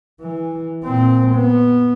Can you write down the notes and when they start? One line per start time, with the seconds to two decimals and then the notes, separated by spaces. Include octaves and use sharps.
0.21 E3
0.85 A#2 C4
1.34 B3